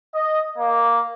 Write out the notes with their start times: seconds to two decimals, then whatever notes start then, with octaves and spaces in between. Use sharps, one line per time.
0.13 D#5
0.57 A#3